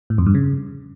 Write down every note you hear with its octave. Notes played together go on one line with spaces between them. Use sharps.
A2
F2
G2
C#3